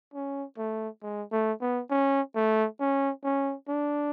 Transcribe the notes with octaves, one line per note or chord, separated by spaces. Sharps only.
C#4
A3
G#3
A3
B3
C#4
A3
C#4
C#4
D4